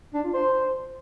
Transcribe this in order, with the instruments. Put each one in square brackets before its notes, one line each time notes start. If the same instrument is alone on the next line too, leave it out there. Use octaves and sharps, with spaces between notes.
[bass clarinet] D4
F4
C5